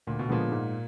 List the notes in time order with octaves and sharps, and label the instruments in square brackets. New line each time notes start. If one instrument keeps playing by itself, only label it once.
[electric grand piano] D2 [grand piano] A#2
[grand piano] B2
[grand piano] A#2 [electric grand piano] D3 F3 G#3 B3
[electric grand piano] G#2